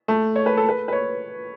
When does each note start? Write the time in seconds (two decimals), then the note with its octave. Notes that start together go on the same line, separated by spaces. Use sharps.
0.08 A3
0.36 C#5
0.46 B4
0.57 A4
0.69 B4
0.88 B4
0.93 C#5